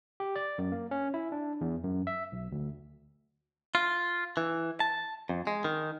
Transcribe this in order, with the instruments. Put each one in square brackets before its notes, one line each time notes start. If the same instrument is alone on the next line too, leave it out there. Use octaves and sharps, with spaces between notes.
[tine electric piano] G4
D5
F#2
A#3
C#4
E4
D4
E2
F#2
E5
B1
D2
[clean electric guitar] F4
E3
A5
F2
G#3
D#3